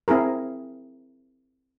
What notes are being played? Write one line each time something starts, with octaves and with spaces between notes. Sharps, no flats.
C4 E4 G#4 A#4